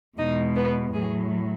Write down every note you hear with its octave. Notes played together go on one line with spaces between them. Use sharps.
E2 B2 G#3 D#4 D#5
B3 B4
A2 F#3 G#4